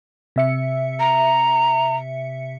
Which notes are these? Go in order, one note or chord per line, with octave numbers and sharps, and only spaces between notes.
C3 E5 C#7
A#5